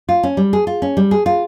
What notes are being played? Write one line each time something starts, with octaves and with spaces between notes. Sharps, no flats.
F4
C#4
G3
G#4
F4
C#4
G3
G#4
F4